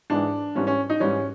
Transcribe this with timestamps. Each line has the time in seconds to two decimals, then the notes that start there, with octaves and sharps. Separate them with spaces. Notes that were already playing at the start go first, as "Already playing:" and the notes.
0.10 G#2 E3 G#3 D4
0.55 G#2 E3 G3 C#4
0.67 C#4
0.89 D#4
1.00 G#2 E3 G3 C#4